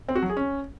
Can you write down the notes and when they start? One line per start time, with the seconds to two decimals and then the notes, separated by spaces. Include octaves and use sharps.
0.08 C4
0.15 F#4
0.22 F#3
0.30 G#4
0.37 C#4